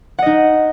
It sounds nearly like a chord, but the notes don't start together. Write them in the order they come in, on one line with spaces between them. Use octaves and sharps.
F#5 D#5 D#4